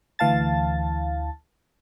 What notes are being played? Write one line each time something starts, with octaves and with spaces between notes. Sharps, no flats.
D2 E3 F5 A5 A6